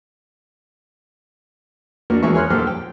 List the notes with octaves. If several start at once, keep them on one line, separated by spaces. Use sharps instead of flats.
A#1 A#2 D4 F#4 A#4
E2 E3 G#3 F#4 E5 C#6
G#4 A#4 C#5 C6 F6 F#6
A#1 F#2 G4 A4 C5 F6
G5